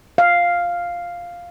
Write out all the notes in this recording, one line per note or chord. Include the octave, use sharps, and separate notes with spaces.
F5